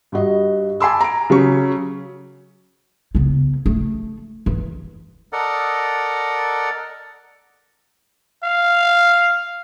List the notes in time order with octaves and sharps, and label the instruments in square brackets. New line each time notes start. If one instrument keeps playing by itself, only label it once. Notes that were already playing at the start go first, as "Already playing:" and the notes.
[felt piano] G2 F#4 D#5
G#5 A5 B5 C6 D6 E6
A#5 D7
C#3 F#3 C#4 C#6
[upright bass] C#3 B3
A3
E3
[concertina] A4 A#4 D5 D#5 F#5
[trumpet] F5